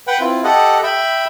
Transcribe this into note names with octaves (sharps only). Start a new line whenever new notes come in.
B4 F#5 G5
C4 E4 F4
G4 A4 D#5 F#5
E5 G5 B5